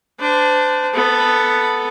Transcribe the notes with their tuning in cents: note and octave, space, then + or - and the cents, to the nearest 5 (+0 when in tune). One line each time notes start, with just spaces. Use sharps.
D4 +0 C5 -35
B3 +0 A4 +0